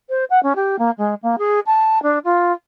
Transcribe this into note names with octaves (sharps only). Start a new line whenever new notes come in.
C5
F#5
C#4
G4
A#3
G#3
A#3
G#4
A5
D4
F4